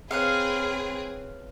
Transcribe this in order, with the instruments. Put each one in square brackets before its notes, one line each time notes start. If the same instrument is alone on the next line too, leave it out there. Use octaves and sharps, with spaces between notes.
[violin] C4 G#4 [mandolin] B4 C#5 F5